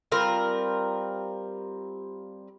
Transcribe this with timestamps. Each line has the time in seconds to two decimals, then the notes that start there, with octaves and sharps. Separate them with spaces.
0.12 G3 C4 F4 A#4